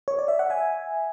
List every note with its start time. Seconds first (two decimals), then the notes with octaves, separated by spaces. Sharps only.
0.08 C#5
0.19 D5
0.28 E5
0.39 F#5
0.50 E5 G#5